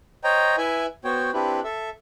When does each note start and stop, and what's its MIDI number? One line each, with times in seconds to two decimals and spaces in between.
0.24 0.56 72
0.24 0.56 73
0.24 0.56 75
0.24 0.56 79
0.24 0.56 82
0.58 0.86 64
0.58 0.86 71
0.58 0.86 76
0.58 0.86 80
1.05 1.31 59
1.05 1.31 66
1.05 1.31 72
1.05 1.31 73
1.05 1.31 79
1.34 1.60 60
1.34 1.60 62
1.34 1.60 64
1.34 1.60 67
1.34 1.60 71
1.64 1.90 69
1.64 1.90 76